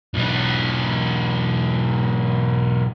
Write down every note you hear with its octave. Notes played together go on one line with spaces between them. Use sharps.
B1 E3